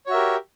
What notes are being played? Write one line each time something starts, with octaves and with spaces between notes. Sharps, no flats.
F#4 G4 A#4 C#5 E5